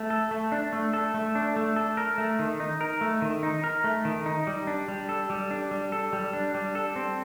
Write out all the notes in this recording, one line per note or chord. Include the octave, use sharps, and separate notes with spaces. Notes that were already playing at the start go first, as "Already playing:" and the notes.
Already playing: A3
A4
A3
D4
A3
A4
A3
D4
A3
A4
A#4
A3
D#3
D#4
A#4
A3
D#3
D#4
A#4
A3
D#3
D#4
G3
D4
G3
A4
G3
D4
G3
A4
G3
D4
G3
A4
C4